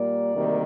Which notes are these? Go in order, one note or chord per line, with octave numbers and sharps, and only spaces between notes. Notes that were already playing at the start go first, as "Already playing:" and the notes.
Already playing: A#2 G3 A#3 D5
D2 C3 D#3 G3 A#3